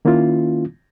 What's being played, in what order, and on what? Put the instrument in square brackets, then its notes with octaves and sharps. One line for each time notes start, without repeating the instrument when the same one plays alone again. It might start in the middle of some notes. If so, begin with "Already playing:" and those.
[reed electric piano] D#3 A#3 C#4 E4 F4